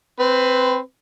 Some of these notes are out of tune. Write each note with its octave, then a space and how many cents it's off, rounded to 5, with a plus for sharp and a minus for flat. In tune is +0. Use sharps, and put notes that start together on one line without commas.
C4 +0 B4 +20